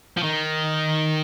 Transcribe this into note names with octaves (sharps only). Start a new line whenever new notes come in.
F3
D#3